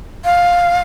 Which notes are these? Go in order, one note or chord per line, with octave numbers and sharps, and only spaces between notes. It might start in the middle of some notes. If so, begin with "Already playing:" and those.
F5